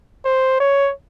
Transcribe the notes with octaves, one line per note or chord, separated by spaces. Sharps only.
C5
C#5